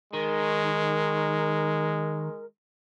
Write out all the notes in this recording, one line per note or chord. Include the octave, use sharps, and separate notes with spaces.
D#3 G#3 A#4